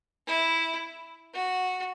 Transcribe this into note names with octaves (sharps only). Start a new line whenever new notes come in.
E4
F#4